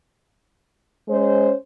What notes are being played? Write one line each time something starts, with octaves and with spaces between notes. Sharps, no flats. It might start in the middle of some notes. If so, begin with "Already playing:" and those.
G#3 C#4 C5